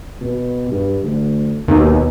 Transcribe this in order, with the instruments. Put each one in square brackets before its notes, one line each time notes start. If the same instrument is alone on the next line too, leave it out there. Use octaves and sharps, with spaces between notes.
[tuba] B2
G2
D2
[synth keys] D#2 [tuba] B2